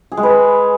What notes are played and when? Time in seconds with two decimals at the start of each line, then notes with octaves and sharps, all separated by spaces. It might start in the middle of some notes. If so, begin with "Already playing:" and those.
0.12 G#4
0.17 G#3
0.23 B4